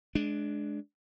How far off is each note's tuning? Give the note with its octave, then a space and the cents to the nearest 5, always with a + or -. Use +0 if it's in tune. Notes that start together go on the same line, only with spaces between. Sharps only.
G#3 +25 D4 +0